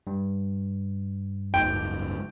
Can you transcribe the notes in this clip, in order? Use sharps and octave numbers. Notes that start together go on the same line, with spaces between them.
G2
F#1 C#2 G#2 G5